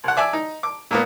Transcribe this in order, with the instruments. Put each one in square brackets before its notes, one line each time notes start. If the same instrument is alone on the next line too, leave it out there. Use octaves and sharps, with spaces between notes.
[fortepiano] C2 F#5
D5 E5 G#5 D6
D#4
D6
A#2 A#3 B3